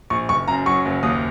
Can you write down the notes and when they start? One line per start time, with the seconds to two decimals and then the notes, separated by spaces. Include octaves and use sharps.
0.10 A#1 C#6
0.29 F#1 C#6
0.48 F#2 A#5
0.66 F#3 C#6
0.85 F#1
1.03 D#2 D#6